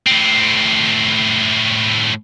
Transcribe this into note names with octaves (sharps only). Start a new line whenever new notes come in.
A2 C4